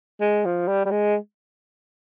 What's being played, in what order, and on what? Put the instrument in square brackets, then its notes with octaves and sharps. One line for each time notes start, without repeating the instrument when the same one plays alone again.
[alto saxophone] G#3
F3
G3
G3
G#3